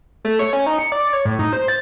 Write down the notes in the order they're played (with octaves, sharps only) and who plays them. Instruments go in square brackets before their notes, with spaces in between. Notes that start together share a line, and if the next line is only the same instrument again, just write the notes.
[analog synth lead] A3
C#5
C#4
D#4
C#7
D5
C#5
A2
D#4
C5
A6